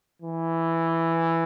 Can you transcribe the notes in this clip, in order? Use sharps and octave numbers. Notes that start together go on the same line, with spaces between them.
E3